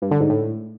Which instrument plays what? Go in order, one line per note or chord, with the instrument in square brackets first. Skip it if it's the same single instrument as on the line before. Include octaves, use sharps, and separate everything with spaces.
[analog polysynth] G2
D3
G#2
A2